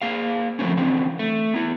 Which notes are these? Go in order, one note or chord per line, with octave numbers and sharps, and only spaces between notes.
A#3 G#4 F5
D3 F3 G3 A3 C4 C#4
D3 E3 C4
A3
B3 E4